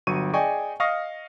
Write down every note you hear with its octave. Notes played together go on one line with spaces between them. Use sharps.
G1 F#3 C#6 D#7
G#4 D5 D#5 G5 G#5 C#6
D#5 F5 C#6 D#6 F6 A#6